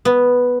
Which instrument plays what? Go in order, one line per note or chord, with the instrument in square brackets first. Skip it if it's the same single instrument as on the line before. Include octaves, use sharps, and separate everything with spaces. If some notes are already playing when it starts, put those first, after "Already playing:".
[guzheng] B3